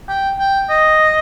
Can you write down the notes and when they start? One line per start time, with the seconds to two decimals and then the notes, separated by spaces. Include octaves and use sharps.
0.09 G5
0.39 G5
0.70 D#5